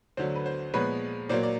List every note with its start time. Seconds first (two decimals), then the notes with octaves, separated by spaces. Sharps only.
0.17 D2 D3 F#3 C5
0.35 B4
0.46 C5
0.74 A#2 F3 G#3 B3 B4 C#5
1.29 A#2 F#3 A#3 C5 D5
1.43 D5